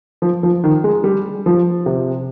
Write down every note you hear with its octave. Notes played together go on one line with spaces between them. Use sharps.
F3
F3
D#3
G#3
G3
F3
C3